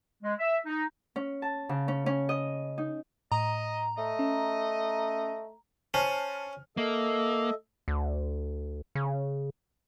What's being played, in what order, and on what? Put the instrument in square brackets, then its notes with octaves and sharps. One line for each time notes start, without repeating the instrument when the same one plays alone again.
[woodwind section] G#3
E5
D#4
[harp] C#4
A5
C#3
C#4
C#4
D#5
D#4
[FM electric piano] A2 [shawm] D#5 [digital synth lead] A#5
[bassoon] A3 [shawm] D#5
[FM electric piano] C#4
[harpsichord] C#4 [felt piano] C5 A5 F6
[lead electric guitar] A#3 [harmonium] A4 D#5 E5
[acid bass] D2
C#3